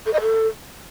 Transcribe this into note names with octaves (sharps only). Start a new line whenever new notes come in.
A4
D#5
A4